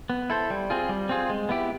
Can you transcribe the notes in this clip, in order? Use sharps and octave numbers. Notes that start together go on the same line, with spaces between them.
B3
E4 A4 C5
G3
C4 F4 G#4
G3
C4 F4 G#4
G#3
B3 E4 G4